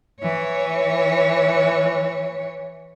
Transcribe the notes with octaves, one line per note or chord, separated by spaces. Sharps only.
E3 C#5